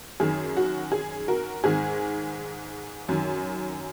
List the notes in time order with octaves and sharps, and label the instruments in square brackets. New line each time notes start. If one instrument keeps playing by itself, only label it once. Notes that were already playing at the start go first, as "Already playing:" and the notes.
[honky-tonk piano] F#2 D#3 G#4
F#4
G#4
F#4 A#4
G#2 D#3 G#4
F#2 D#3